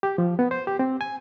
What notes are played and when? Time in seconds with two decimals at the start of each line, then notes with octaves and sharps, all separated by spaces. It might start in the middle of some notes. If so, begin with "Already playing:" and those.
0.03 G4
0.18 F3
0.39 B3
0.51 C5
0.67 G4
0.79 C4
1.01 G#5